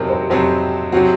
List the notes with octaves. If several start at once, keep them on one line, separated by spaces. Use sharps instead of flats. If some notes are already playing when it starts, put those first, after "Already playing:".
Already playing: F2 C3 F#3 C4 A#4
C5
F2 C3 F#3 C4 C5
C3 F#3 C4 F#4